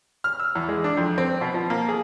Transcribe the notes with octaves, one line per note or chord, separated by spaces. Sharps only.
F6
E6
E2
G#3
D4
F2
C4
B2
F3
A#3
G#4